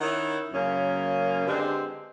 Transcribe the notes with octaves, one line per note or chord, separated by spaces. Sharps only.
D#3 C#4 E4 F#5
F#2 C#3 A#3 C#4
D3 G#3 C4 G4 B4